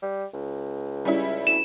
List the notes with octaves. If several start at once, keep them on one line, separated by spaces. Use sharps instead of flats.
G3
C#2
G3 C#4 E4
D2 E7